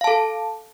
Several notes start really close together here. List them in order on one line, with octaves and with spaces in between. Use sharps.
F5 A5 A4